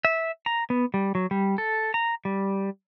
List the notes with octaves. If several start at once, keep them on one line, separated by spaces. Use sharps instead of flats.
E5
A#5
B3
G3
F#3
G3
A4
A#5
G3